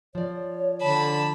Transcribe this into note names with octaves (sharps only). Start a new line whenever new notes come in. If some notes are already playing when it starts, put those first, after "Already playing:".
F3 C#5 D5
D3 A5 B5